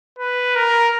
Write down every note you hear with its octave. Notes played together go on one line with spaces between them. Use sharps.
B4
A#4